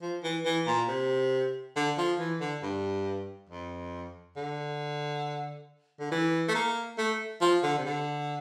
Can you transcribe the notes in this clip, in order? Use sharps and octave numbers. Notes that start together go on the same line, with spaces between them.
F3
E3
E3
A#2
C3
D3
F3
E3
D3
G2
F2
D3
D3
E3
A3
A#3
A3
F3
D3
C3
D3